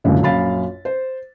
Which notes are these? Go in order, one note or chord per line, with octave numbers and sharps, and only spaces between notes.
F#1 C#2 F#2 A2 D3 E3
A#1 F#2 F5 B5 A6
C5